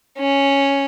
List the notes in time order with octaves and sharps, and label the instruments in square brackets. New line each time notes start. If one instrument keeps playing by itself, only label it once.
[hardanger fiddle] C#4